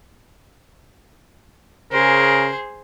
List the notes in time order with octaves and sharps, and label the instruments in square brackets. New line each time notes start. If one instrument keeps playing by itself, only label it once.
[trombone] C#3 [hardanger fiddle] G#4 C5 [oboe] A#4